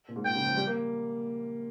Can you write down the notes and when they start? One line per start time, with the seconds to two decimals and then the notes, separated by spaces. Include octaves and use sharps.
0.08 A#2
0.16 G#2
0.25 A#2 G5
0.35 C#3
0.46 F3
0.56 G3
0.67 A#3